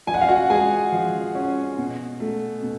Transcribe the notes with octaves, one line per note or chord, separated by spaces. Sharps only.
F3 G#5
F#5
F5
F#4 F#5
G#3 G#4 G#5
F3
C#4
B2
A3
B2